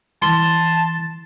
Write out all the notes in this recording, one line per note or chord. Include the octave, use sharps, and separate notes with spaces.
E3 A5 C6